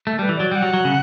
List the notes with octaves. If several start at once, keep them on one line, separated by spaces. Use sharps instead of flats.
A3 A4
G3 B4
E3
F#3 D5
G3 F#5 G5
F#3
F#3
C#3